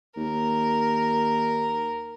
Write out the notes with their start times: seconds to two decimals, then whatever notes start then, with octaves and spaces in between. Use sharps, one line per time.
0.17 D#2 A#4